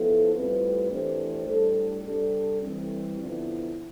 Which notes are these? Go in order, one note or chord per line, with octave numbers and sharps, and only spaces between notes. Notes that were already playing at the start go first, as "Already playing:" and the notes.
Already playing: F3 B3 E4 A4
A2 G3 C4 F4 B4
E3 A3 D4 G4 C5
A2 G3 D4 A4
C3 G3 D4 A4
E3 G3 C4
D3 F3 B3 E4